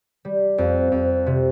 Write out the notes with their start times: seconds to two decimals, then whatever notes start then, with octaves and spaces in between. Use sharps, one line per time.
0.25 G3
0.58 F2
0.92 F2
1.26 C3